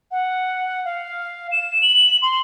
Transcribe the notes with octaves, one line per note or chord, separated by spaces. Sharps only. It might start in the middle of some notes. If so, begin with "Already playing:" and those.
F#5
F5
E7
F#7
C6